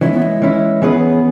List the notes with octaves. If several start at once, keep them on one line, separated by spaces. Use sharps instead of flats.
E3 G#3 C#4 E4
B3
G#3
E3 C#4 E4
E3 B3 C#4 G#4 B4